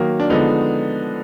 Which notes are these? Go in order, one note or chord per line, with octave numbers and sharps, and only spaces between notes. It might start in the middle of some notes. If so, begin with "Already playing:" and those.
Already playing: D#3 F#3 A#3
D4
D3 F3 G#3 B3 D#4